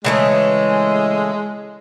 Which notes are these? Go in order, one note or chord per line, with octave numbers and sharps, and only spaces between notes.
C#3 E3 G#3 A3